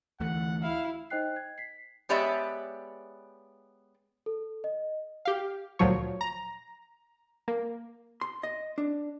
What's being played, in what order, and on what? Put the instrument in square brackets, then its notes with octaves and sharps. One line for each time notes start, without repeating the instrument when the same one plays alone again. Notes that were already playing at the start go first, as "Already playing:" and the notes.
[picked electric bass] D2 E3 A3 [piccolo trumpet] F#5
[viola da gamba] E4 [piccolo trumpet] F5
[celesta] D#4 C5 D#5 G5 F#6 C7
G#6
B6 C7
[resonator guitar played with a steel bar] G#3 B3 G4 C#5 D5 E5
[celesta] A4
D#5
[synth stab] G4 F5
D2 A#2 F3 F#3 C#5
A#5
A#3
[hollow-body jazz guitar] C6
D#5
D4